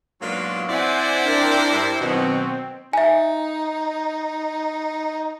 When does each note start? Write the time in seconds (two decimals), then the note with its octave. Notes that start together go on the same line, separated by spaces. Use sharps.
0.22 G#2 B2 F#3 A#3 D4 F4
0.69 C4 E4 C5 D5 F#5 G#5
1.23 D4 A#4 G5
1.72 G2 G3 D5
2.01 B2 D#3 F#3 C4
2.93 D#4 E5 G#5